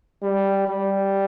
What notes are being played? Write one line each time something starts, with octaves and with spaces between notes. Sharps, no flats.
G3
G3